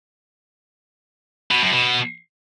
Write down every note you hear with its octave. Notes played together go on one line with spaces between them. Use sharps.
B2
F#2
B2